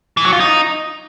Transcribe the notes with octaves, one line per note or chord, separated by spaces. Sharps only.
E3
F#3
F4
D#4